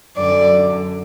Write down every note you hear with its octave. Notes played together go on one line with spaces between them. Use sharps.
F#2 D3 D5